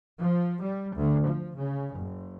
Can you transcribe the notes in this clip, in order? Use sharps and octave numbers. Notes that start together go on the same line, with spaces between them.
F3
G3
D2
F3
C#3
F#1